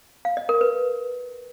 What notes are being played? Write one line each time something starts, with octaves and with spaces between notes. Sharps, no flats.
F5
D#5
A#4
B4